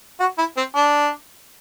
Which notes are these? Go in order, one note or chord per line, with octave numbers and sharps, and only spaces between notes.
F#4
E4
C4
D4